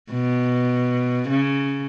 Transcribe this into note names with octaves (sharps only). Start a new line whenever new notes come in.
B2
C#3